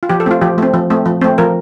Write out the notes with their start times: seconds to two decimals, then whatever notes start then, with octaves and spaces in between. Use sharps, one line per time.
0.03 F4
0.09 F3 G4
0.20 A4
0.26 A3 C4 F4
0.41 F3 G4
0.58 A3 C4
0.74 F3
0.90 A3 C4
1.06 F3
1.21 A3 C4
1.38 F3 A#4